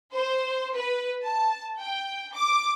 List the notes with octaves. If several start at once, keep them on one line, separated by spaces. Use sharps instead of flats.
C5
B4
A5
G5
D6